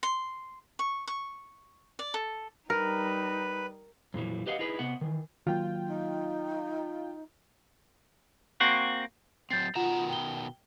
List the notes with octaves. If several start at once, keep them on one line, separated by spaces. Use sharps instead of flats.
C6
C#6
C#6
D5
A4
G3 D#4 A#4 B4
F2 A#2 E3 F#3
G4 B4 D#5 F5 F#5
D#4 E4 G#4 B4
C3 B3 F#5
D#3 E3
D#3 F#3 A#3 F4 G5
D#4
A#3 C4 F#4
F#3 C4 G6 A6 C7
B2 D#3 F4 F#5 A#5 E7
G5 G7